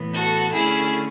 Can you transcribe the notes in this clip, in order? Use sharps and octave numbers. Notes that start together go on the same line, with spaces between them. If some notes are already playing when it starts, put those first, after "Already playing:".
Already playing: A2 E3 B3
F#4 A4
D3 A3 C#4 E4 G#4